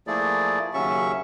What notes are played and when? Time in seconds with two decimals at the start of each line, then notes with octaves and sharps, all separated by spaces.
0.07 F3 A3 A#3 E4 G#4 D5
0.74 D#2 C#3 F#3 C#4 E5 C#6